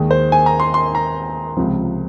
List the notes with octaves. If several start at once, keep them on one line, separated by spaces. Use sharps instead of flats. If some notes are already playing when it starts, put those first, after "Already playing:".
Already playing: D#2 D#3 G#3
C5
G#5
A#5
C6
C6
A#5
C#2 C3 F3